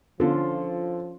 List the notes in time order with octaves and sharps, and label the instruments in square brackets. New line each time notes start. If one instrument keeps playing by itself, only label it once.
[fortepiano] D3 A4 [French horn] F3 [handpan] C#4 F4